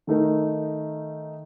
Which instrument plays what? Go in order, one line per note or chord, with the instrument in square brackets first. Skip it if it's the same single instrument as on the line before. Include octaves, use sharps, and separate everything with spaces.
[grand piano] D#3 A3 D#4 A#4